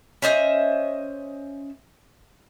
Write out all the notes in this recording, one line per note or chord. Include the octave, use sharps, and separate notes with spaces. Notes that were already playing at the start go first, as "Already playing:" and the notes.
C#4 C5 D#5 E5